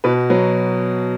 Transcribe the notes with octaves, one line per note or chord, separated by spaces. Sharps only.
B2 B4
F#3 B4